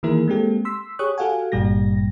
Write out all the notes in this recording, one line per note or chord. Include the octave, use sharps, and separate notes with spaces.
D#3 E3 A#3 E4 G#4 A#4
G#3 A#3 C4 G4 A4
C6 E6 B6
G4 G#4 C#5 C#6 D#6 F#6
F#4 G4 A4 F5 F#5 G#5
G#1 G2 A#2 G3 G4 A#6